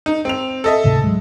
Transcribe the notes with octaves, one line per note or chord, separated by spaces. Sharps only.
D#4
C4 F7
A4 D#5 E5
D2 G#2 C3
F#3 G#3